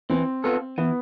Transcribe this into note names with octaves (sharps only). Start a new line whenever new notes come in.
E3 C4
B3 F4 A4
E3 B3